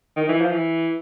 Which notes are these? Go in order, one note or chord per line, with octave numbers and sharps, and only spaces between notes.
D#3
E3
F3
E3